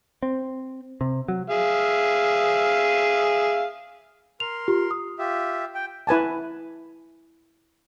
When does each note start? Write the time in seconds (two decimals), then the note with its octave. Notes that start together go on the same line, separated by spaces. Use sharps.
0.23 C4
1.01 C3
1.28 F#3
1.50 G#4 E5 F5
4.40 A#4 C6 F7
4.68 F4 G4
4.91 D#6
5.19 F4 G4 E5
5.75 G5
6.07 E4 B4 G#5 A5